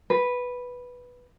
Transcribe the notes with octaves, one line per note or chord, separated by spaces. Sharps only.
B4